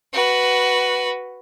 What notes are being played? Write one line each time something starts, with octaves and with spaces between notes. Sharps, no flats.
F#4 B4